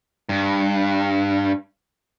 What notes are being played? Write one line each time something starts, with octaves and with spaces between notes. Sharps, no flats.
G2